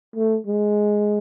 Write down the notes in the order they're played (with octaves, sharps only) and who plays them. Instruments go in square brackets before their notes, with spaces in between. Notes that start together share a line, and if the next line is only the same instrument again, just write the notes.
[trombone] A3
G#3